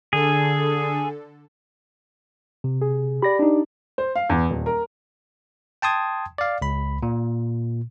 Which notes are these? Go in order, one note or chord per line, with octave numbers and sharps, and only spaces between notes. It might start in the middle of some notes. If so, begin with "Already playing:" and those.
D3 G#4 A4
C3
G#4
G4 D5 B5 A#6
D4 D#4
C5
F5
E2
D#1
A#4
G5 A5 C6 D#6 G#6
D5 F5
C#2 B5
A#2